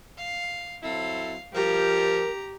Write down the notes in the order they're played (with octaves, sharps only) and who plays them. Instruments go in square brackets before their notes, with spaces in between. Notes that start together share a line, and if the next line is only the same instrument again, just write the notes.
[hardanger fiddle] F5
[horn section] F#3 E4 A4 [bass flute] C4 [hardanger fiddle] F5
[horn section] F3 G3 [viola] G4 [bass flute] A#4 [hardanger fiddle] A#5